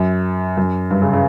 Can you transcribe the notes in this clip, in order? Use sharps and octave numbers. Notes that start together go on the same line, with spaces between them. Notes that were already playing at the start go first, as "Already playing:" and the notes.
Already playing: F#2
F#2
G2
C#3
C#3